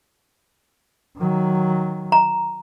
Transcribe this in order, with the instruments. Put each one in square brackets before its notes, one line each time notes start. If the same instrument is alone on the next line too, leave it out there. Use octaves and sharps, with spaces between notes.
[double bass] D#3 F#3
[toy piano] A#5